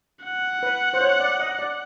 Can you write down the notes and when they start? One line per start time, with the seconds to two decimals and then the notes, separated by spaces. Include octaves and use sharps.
0.24 F#5
0.63 B4
0.94 C5
1.01 C#5
1.20 D5
1.40 D#5
1.59 D5